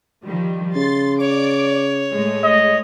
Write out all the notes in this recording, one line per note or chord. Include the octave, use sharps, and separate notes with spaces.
D#3 F3 G3
C#3 C6 A6
C#5 D5 D6
A2 G#3 A3
D#5